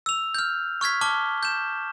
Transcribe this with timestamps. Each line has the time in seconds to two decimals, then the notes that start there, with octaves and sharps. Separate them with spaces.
0.06 E6 F7
0.34 F6 G6
0.81 C#6 F6 G#6 B6
1.01 A5 D6 F6 G7
1.43 G6 E7